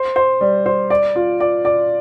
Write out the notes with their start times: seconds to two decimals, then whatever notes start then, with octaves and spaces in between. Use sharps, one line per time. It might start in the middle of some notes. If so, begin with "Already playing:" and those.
Already playing: C5
0.16 C5
0.41 G3
0.66 C5
0.90 D5
1.16 F4
1.40 D5
1.65 D5